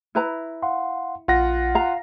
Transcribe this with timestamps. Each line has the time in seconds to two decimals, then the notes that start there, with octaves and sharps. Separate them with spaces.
0.15 E4 B4 A#5
0.62 F5 F#5 C6
1.28 A#1 F4 F#5 A#6
1.75 F5 A#5